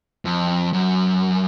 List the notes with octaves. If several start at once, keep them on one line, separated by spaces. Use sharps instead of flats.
F2
F#2